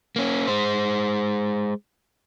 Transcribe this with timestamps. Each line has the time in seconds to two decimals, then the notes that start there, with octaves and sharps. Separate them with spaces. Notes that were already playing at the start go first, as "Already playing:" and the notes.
0.16 A#3 C#4
0.48 G#3 C5